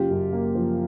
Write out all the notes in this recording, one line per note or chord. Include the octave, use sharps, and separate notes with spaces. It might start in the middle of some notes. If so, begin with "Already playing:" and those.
Already playing: F#1 C#3 F4 G4
F#2
A#3
F3